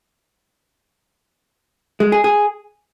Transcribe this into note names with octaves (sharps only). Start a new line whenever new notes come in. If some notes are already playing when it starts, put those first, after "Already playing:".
G#3
G#4
G#4